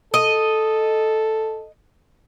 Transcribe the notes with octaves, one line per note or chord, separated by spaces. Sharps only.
A4 D#5